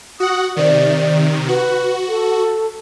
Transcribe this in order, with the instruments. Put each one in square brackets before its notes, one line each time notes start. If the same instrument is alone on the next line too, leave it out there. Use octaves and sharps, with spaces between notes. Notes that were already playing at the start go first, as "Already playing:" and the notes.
[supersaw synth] F#4 F#5 [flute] D#6
[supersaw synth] C3 D#3 [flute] D5
[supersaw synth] F#4 [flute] B4
[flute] A4